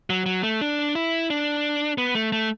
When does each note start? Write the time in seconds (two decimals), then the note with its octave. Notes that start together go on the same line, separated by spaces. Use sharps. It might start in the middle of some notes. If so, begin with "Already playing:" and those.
0.10 F#3
0.26 F#3
0.43 A3
0.61 D4
0.95 E4
1.30 D4
1.98 B3
2.15 A3
2.32 A3